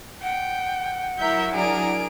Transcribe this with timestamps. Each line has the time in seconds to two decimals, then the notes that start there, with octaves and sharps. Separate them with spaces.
0.22 F#5 G5
1.19 F#3 E4 A#4 E5 G6
1.54 D4 G#4 A#4 D7